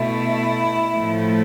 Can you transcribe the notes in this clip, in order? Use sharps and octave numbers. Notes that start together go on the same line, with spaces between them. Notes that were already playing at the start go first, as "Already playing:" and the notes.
Already playing: B2 A3 E4
A2 F3 A3